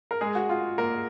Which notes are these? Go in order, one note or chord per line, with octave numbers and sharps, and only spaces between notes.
A#4
G#3 G#4
F#4
F4
A#3 A#4